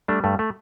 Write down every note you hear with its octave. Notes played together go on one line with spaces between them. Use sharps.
G3 A3 D4
G2 A3
A3